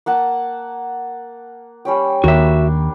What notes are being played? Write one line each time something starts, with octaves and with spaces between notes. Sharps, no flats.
A#3 F#5 A5
G3 C#4 G5
D#2 A#3 D4 F#4 E5